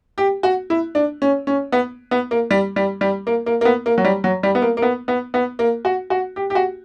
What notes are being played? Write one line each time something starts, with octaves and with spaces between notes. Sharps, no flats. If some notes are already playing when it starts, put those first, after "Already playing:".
G4
F#4
E4
D4
C#4
C#4
B3
B3
A#3
G3
G3
G3
A#3
A#3
A#3
B3
A#3
F#3
G3
F#3
G3
B3
A#3
A#3
B3
B3
B3
A#3
F#4
F#4
G4
G4
F#4